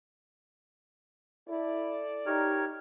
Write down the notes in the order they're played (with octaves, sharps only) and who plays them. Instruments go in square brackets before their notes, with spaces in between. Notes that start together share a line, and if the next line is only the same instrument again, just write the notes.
[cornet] E4 [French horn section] A4 D5
[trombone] D#4 [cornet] G4 [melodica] A#4 C#5